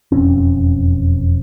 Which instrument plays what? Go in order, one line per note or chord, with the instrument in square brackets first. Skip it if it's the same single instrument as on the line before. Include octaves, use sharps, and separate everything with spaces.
[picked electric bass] E1 F2 C4 C#4